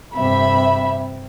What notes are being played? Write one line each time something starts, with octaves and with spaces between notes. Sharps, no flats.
G2 C3 E5 B5